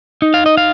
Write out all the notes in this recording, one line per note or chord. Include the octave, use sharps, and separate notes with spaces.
D#4
F5
D#5
F5